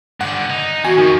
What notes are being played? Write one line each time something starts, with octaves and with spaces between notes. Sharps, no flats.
G2 D3 F#5
D#4
E2 F#4 G#5
F2 D#3